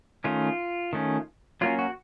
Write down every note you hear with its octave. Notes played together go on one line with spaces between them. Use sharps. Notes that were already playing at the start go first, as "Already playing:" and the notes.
D#3 A3 C#4 F4
D#3 A3 C#4
F#3 A#3 C#4 F4
F#4